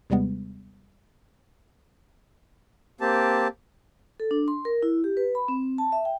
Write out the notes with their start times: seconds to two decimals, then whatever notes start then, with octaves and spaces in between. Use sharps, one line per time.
0.10 D#2 C3 G3 G#3 B3
3.01 A#3 C4 G4 A5
4.20 A4
4.31 D4
4.48 C6
4.65 A#4
4.83 E4
5.04 G4
5.17 B4
5.35 B5
5.48 C4
5.78 A5
5.92 E5
6.05 G5